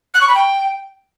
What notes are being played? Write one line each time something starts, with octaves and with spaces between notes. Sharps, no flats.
F#6
C#6
B5
G5